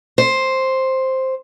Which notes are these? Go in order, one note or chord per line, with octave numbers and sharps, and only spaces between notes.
C5